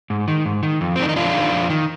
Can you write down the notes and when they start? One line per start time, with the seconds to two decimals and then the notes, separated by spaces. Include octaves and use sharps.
0.10 G#2
0.28 D#3
0.46 G#2
0.63 D#3
0.81 F2
0.96 C4
0.99 D#3 D4
1.09 D#4
1.16 F2 D4 F4
1.34 D#3
1.52 F2
1.70 D#3